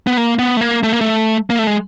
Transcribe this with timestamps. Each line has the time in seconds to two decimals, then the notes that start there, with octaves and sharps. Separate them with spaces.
0.07 B3
0.17 A#3
0.39 B3
0.57 A3
0.61 A#3
0.83 A3
0.93 A#3
1.01 A3
1.50 A#3
1.59 A3
1.67 G#3